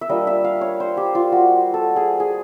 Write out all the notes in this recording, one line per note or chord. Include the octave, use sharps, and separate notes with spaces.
E5
G3 A#3 D4 F4 D#5
E5
F5
C#5
C5
G4
F4
F#4
A4
G#4
G#4